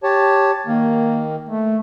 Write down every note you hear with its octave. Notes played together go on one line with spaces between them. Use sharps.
G4 C#5 A5
D#3 A#3
A3